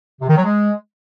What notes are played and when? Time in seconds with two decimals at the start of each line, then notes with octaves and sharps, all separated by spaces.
0.21 C3
0.28 D#3
0.36 F#3
0.44 G#3